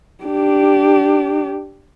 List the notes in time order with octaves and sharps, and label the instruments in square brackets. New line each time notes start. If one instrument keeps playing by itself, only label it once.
[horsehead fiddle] D4 G4